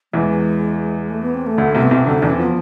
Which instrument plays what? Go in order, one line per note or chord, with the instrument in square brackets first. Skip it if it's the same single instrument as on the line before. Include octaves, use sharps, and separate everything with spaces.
[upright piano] E2 E3 [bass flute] G#3
[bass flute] A3
B3
C4
A3
[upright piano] D2 D3
[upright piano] C2 C3 [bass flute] A3
[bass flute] B3
[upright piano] C2 C3 [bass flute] C4
[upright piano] D2 D3 [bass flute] D4
[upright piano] E2 E3 [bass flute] D4
[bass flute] C4
[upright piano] F3 [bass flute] B3